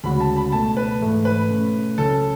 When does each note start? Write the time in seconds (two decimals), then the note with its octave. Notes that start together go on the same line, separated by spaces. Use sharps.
0.04 D2 C#3 G#3 C#4 F#4 B5
0.20 A5
0.36 B5
0.52 C#2 B2 A3 A5
0.77 B4
1.01 G#2 E3 A3 E4
1.25 B4
1.50 B2 A3 C#4
1.98 C#2 C#3 F#3 C#4 A4